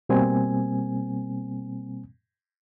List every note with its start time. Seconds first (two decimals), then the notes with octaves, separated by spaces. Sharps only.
0.09 B2 G3 A#3 C4 G#5